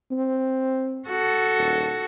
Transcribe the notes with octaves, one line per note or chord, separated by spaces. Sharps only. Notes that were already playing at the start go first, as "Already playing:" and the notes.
C4
F#4 A4
D#1